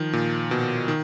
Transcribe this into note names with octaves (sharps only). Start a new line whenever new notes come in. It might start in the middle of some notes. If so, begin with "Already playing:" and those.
Already playing: D#3 F3
A#2
B2
D#3